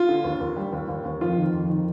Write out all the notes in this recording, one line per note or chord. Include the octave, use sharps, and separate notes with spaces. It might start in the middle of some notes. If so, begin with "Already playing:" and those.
Already playing: F4
D3
D#2
D#2
G3
D#2
D#2
D#2
F2 F4
D#3
F2
D#3